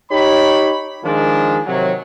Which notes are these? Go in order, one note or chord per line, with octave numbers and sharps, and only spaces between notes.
D#4 G4 C#5 B5
D#3 F3 G#3 D4
C3 D#3 F#3